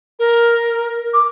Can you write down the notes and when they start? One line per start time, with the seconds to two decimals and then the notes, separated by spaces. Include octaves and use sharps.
0.19 A#4
1.14 D6